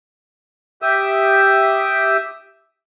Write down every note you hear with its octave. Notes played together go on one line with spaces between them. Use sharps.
G4 E5 G5 D#6 E6